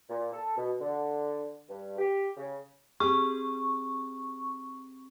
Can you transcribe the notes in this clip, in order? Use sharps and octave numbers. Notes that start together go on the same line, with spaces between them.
A#2
A4
B2
D3
G2
G4
C#3
C4 G4 G#4 C#6